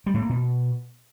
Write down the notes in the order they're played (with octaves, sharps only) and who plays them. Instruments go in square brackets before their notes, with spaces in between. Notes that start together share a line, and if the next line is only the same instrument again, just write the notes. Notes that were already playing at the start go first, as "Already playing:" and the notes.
[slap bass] G3
A2
A#3
B2